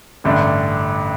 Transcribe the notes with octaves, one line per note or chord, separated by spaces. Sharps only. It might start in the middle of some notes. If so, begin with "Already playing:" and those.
A1 G2 D3 A3 D4